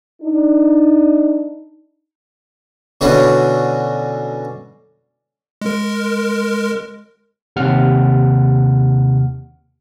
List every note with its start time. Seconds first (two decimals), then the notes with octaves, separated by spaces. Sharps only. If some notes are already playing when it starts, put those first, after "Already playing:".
0.21 D4 D#4
3.01 B2 D3 C#4 E4 F#4
5.62 G#3 A#4
7.56 D#2 C3 F#5 F6